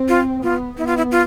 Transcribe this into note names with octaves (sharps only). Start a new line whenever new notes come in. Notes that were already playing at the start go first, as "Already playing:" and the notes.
Already playing: C4
F4
B3 F4
B3 E4
F4
E4
F4